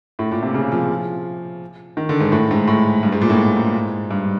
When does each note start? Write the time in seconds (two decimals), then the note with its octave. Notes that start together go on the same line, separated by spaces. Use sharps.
0.19 A2
0.31 A#2
0.42 C3
0.54 C#3
0.72 F3
1.97 D#3
2.09 D3
2.20 G#2
2.32 A2
2.51 G#2
2.67 A2
3.03 G2
3.12 G#2
3.21 A#2
3.30 A2
3.56 G#2
4.11 G2